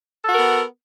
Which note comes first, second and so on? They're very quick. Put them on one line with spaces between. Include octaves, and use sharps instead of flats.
A4 F#4 A#4 B3